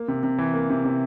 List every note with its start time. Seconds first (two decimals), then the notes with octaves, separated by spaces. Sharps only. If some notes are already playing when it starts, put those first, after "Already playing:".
Already playing: A#3
0.08 C3
0.23 C3
0.38 E3
0.54 A#3
0.69 C3
0.85 C3